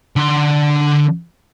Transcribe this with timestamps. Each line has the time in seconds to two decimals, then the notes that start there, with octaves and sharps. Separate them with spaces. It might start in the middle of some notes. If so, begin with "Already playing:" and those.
0.16 D3 C6